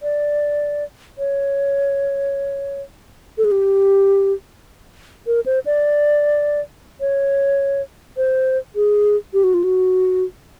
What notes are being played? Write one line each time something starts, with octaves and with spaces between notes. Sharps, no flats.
D5
C#5
A4
G#4
G4
A#4
C5
D5
C#5
C5
G#4
G4
F#4
F4
F#4